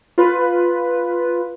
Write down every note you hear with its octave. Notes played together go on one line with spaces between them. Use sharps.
F4 B4